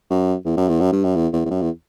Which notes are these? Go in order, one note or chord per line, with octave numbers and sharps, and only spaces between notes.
F#2
E2
F#2
E2
F#2
G2
F#2
E2
E2
E2
F#2
E2